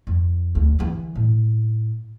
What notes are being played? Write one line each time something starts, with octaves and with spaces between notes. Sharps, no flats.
F2
D2
D3 E3
A2